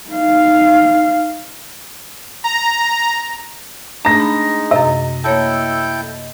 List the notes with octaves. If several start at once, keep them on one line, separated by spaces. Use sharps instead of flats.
D#4 F5
A#5
G#3 A3 D4 D#4 A#5 A#6
B5
F#2 C3 D#5
A#3 E4 A4 C#5 G5 A5